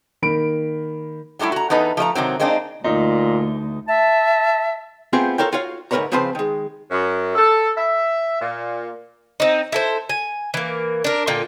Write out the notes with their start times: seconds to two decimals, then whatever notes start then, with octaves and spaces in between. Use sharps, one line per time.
0.22 D#3 A#3 B5 D7
1.39 F#3 G3 A3 D#4 E4
1.52 F#4 A#5
1.70 E2 B3 D#4 A4 B4
1.97 F3 A3 D#5 A#5
2.15 C3 D#3 F#3 C4
2.40 G#3 A#3 C4 D4 D#4
2.84 D2 A#2 D#4
3.88 E5 A5
5.13 A3 B3 C4 F4 G4 G#4
5.38 F4 A4 A#4 C#5 G5
5.53 F4 F#4 C#5 F5
5.91 D2 G#2 A#4 B4 C#5 A#5
6.12 C#3 F3 C4 B4 C5 A5
6.35 D#3 G#3
6.89 F#2
7.35 A4
7.75 E5
8.40 A#2
9.40 C4 D#4
9.72 E4 A4 C5
10.09 G#5
10.54 E3 A#3
11.04 D4 A#4
11.27 A#2 D3 F4 G5